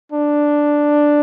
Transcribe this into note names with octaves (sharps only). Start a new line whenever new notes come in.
D4